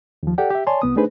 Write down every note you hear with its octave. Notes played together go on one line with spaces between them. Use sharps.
D#2 F3
G4 A4 D5 F#5 G5
G4 E5
C#5 D5 G#5 A5 C6
C2 B3 D#6
A3 D4 D#4 G#4 B4 C5